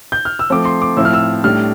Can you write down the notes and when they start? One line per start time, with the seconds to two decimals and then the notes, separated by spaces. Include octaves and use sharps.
0.12 G6
0.25 F6
0.39 E6
0.50 F3 A3 C4 D6
0.65 C6
0.82 D6
0.97 A2 F3 C4 E4 E6
1.05 F6
1.14 E6
1.44 A2 G3 D4 F6